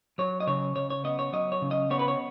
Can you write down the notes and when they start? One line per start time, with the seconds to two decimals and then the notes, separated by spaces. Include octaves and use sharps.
0.18 F#3 C#5
0.40 D#5
0.47 C#3 C#5
0.76 C#3 C#5
0.90 C#5
1.04 B3 D#5
1.19 C#5
1.33 F#3 D#5
1.52 C#5
1.62 C#3
1.71 D#5
1.90 B3 C#5
1.99 B4
2.08 C#5